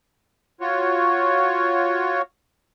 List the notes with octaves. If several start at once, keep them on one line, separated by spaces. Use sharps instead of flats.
F4 F#4 C#5